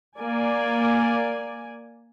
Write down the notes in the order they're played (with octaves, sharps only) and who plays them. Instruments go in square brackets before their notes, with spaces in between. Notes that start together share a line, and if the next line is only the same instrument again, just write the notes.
[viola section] A#3 D5 G#5